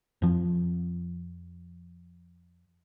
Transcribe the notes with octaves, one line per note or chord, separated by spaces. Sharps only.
F2 F3